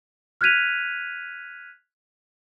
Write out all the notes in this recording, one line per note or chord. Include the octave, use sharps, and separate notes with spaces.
F6 F#6 G#6 B6 D#7 F7